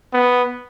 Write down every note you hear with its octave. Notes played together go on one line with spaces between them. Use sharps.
B3